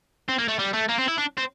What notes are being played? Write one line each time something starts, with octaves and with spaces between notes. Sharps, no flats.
C4
A#3
A3
G3
A3
A#3
C4
E4
D4
C4